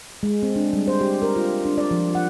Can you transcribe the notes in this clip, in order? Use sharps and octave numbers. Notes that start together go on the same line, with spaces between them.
G#3
C4
D4
G3
C5
G4
A#4
F4
D4
D5
F3
F#5